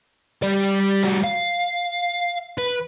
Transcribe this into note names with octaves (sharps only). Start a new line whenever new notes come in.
G3 D5
G3 F#4
F5
B4